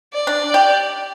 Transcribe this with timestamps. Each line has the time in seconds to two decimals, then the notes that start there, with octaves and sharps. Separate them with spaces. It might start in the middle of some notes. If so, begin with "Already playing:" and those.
0.14 D5
0.27 D4
0.54 G4